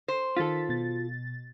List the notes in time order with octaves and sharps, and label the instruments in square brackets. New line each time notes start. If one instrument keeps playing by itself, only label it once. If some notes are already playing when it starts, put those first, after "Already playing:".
[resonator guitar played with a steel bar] C5
[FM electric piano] D#3 A6 B6 [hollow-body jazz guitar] F4 A4
[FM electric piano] B2 A6